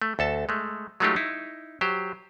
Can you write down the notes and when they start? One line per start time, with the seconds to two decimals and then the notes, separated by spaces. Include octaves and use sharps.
0.02 A3
0.19 D2 A4 A5
0.49 G#3 A3
1.00 F#3 G#3 A3 D#4 F4 G4
1.16 D#4 E4
1.81 F#3 G4 C5